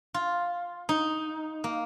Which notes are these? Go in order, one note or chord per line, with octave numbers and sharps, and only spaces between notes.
F4
D#4
A#3